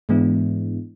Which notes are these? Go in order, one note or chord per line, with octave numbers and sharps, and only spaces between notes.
G#2 E3 G#3 B3 D4 E4